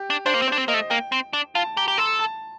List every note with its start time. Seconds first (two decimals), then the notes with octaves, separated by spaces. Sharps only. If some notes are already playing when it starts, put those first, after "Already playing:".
Already playing: G4
0.10 D4
0.26 D4 C5
0.34 A#3
0.42 C4
0.48 D4 C5
0.58 C4
0.68 A#3 D#5
0.74 A3
0.90 A#3 G5
1.12 C4
1.33 D4
1.55 F4 A5
1.77 G4 A#5
1.88 G4
1.98 A4 C6
2.19 A5